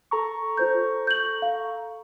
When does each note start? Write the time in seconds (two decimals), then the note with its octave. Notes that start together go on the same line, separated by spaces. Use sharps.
0.11 A4 A#5 C#6
0.57 F4 C5 G6
1.07 G6 F#7
1.42 F5